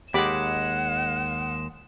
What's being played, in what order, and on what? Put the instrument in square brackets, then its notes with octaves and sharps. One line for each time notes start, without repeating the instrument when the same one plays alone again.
[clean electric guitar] D#2 G#3 [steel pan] G4 B5 D6 [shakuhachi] F#5 [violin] E7